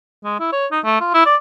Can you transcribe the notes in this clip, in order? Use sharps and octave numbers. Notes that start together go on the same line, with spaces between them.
G#3
E4
C#5
D#4
A3
F4
E4
D5